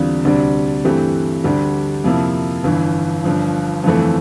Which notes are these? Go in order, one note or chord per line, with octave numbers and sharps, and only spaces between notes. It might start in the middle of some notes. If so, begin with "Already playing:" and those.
Already playing: E2 D3 G3 C4 F4
D2 C3 G3 D4
G2 E3 A3 C4 G4
D2 D3 G3 D4 G4
F2 C3 F3 A#3 E4
G1 G2 E3
G1 G2 F3
G1 F2 E3 A3 C4